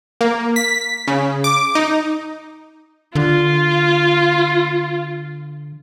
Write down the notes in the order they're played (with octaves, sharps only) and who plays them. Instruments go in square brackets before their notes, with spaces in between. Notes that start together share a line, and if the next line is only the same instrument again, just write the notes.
[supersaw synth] A#3
B6
C#3
D6
D#4
[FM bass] D3 [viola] F4